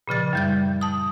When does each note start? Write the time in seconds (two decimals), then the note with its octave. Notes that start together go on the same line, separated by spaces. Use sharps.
0.07 A#2 C#3 F3 A6
0.33 F#2 G3 G6
0.81 A5 D#6